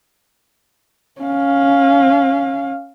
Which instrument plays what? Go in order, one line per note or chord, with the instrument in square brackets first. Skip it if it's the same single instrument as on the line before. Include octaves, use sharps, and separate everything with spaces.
[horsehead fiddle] C#4 F5